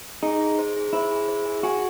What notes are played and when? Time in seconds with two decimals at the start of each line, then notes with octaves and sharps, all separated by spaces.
0.23 D#4 G#4
0.41 G#4
0.59 C5
0.76 G#4
0.93 E4 C5
1.11 G#4
1.29 C5
1.45 G#4
1.63 F#4 G#5